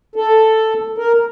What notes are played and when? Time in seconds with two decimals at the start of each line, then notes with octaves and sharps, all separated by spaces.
0.16 A4
0.98 A#4